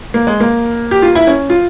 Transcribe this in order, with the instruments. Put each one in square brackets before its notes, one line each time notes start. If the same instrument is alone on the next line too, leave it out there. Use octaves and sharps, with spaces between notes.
[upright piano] A#3
G#3
A#3
G4
F4
E4
C#4
F4